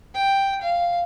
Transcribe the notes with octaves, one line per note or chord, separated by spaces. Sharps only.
G5
F5